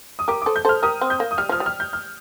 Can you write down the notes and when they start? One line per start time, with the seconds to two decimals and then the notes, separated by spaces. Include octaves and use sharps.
0.19 D#6
0.28 G4 A#4 D6
0.42 A4 C5 D6
0.56 G6
0.65 A4 C5 F6
0.83 G4 A#4 D#6
1.01 C4
1.10 G6
1.20 A#3
1.31 D#6
1.38 G3 F6
1.49 F3 F6
1.60 G3
1.66 F6
1.80 G6
1.93 F6